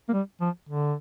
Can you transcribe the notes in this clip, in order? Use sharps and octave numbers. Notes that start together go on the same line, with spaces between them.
A#3
G3
F3
D3